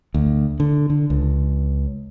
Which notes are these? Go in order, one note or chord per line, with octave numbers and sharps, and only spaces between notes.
D2
D3
D3
C#2